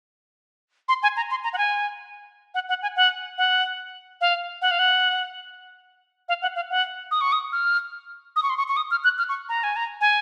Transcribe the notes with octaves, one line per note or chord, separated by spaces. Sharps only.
C6
G#5
A#5
C6
A#5
F#5
G#5
F#5
F#5
G#5
F#5
F#5
F5
F#5
F5
F#5
F5
F#5
F5
F#5
D#6
C#6
D#6
F6
D#6
C#6
C6
C#6
C#6
D#6
F6
F#6
F6
C#6
A#5
G#5
A#5
G#5